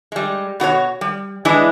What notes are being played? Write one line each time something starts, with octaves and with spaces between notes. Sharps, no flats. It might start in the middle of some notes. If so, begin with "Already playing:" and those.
G3 G#3
B2 F#4 A4 C#5
G3
E3 G#3 D4 E4 D#5 G#5